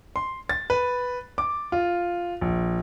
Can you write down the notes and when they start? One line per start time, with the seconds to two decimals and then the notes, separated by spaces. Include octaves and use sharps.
0.16 C6
0.49 A6
0.70 B4
1.38 D6
1.72 F4
2.41 A#1